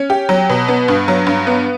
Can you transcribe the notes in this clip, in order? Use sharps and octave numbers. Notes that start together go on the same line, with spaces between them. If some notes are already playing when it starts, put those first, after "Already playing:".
Already playing: C#4
G4
F#3
B2
B3
G2
F#3
G2
B3